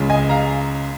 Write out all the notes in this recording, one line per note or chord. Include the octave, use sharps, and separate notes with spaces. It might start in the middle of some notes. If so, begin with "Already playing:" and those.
Already playing: C#2 C#3 G#3
D#5 G#5
F5 A#5